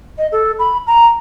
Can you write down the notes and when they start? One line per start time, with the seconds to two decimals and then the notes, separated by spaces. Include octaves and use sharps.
0.18 D#5
0.32 A4
0.59 B5
0.87 A#5